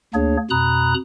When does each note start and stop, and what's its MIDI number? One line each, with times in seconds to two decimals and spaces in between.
0.14 0.37 38
0.14 0.37 58
0.14 0.37 62
0.14 0.37 68
0.14 0.37 73
0.50 0.94 41
0.50 0.94 47
0.50 0.94 82
0.50 0.94 83
0.50 0.94 87
0.50 0.94 90